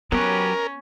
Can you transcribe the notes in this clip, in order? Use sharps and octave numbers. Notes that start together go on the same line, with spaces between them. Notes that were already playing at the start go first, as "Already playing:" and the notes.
F#3 B3 C#4 G4 A#4 B4